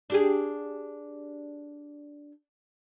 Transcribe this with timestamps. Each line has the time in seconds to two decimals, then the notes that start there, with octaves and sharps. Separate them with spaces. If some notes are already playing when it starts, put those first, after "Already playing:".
0.10 D4 G4 G#4